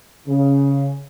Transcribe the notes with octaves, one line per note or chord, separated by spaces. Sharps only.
C#3